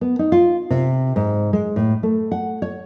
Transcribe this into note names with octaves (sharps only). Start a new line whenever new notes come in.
B3
D#4
F4
C3
G#2
G#3
A2
A3
F#5
C#5